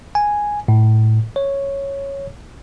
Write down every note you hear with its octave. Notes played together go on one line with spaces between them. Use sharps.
G#5
A2
C#5